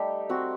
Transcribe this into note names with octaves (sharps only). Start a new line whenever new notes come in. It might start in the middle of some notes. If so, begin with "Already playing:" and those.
Already playing: G3 A3 D#4 G4
C4 F#4